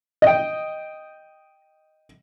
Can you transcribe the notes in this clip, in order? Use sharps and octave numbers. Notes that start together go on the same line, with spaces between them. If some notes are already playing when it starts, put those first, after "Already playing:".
D#5 G5